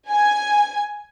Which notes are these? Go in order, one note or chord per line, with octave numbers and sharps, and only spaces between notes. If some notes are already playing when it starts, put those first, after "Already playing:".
G#5